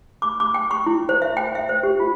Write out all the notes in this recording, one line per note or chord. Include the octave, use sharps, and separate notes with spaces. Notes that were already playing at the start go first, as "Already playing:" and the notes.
D6
D6
G5
C#6
E4
C5
E5
G5
E5
C5
G4
F4